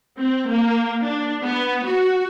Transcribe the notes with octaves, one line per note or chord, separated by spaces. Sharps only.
C4
A#3
D4
B3
F#4